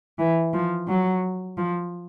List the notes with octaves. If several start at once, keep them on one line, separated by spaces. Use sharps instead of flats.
E3
F3
F#3
F3